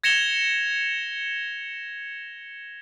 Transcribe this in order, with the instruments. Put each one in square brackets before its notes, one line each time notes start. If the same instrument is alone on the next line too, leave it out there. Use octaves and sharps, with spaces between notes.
[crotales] G#6 A#6 C#7 E7 F7 G7